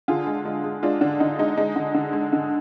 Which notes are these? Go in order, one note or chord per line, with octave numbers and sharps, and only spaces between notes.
D3 F4 G#4
G#3
G#3
G#3
G#3 D4 F4
D3 D4
D3 D#4
G#3 D#4
G#3 D#4
D3
D3
G#3
D3